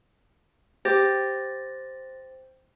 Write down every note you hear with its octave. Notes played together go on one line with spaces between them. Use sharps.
G4 C5 A6 A#6